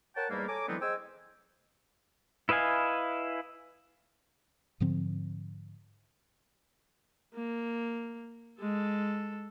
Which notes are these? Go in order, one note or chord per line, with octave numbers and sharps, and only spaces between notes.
A#4 C#5 F#5 G5 A5
E2 G#2 G3 A3 A#3
A4 C#5 G#5 A#5 D6
D3 E3 F#3 G#3 B3 C4
G#4 C5 D#5 G5 G#5 E6
E4 B4 D#5 F5 G#5
G#2 D3 F3 C4
A#3
G#3 A4